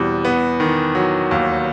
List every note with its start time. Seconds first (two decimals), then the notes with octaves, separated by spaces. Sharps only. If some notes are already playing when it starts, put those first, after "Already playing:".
Already playing: E2 B2 G3 C4
0.25 B3
0.60 D#3
0.95 F#3
1.31 D#2